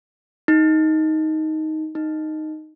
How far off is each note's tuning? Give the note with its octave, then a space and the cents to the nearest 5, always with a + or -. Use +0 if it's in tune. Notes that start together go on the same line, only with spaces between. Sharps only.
D#4 +10
D#4 -5